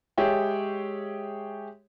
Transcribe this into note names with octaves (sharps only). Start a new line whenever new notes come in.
G#3 G4 G#4 C#5 E5 G5